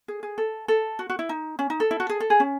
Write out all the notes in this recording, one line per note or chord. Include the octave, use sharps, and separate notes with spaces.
G#4
G#4
A4
A4
F#4
F#4
E4
D#4
C#4
D#4
A4
E4
F#4
G#4
A4
G#4
C#4